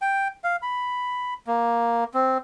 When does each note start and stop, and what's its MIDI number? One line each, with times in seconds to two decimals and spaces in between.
0.02 0.28 79
0.44 0.56 77
0.62 1.34 83
1.47 2.04 58
2.14 2.38 60